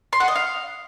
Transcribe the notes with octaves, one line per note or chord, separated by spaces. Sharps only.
C6
F#5
D#5
F5